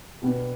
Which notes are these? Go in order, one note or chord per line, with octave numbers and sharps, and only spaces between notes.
B2 B3 D4 G4